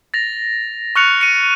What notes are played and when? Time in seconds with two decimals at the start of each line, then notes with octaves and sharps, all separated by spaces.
0.14 A6 A#6 F7
0.96 C#6 F6 F#6 C#7 F7
1.21 C#7 D#7